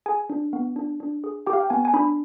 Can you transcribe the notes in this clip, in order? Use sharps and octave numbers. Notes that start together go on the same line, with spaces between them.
G#4 G#5
D4
B3
D4
D4
G#4
G4 G5
F5
G5
B3 G#5
G#5
D4 B5